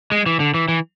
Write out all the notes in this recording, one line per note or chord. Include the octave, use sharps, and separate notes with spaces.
G#3
E3
D3
E3
E3